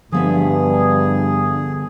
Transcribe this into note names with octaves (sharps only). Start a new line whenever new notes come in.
G2 D3 F3 B3 G#4 E5